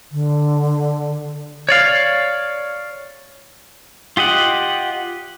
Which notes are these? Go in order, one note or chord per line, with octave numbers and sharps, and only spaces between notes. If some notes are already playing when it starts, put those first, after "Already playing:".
D3
C#5 D5 F5
F4 G4 D#5 F#5